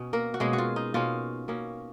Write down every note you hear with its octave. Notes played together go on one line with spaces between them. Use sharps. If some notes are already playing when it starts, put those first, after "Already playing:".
Already playing: B2 C#4
A#3 A#4
F#4
B2 G#3 A#3 C#4 G#4
F#4
F4
D#4
B2 A#3 C#4 F4
B2 A#3 C#4